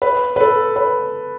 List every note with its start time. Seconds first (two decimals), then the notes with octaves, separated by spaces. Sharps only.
0.02 B4
0.36 B4
0.40 A4
0.76 B4